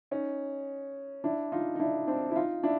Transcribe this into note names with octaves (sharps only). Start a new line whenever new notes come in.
C#4 D#4
D4 E4
D#4 F4
D#4
D4 E4
C4 D4
E4
D#4 F4
D4 E4